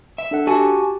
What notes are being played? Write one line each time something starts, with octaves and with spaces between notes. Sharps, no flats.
E5
D4 A4 F#5
F#4 G4 G#5 A5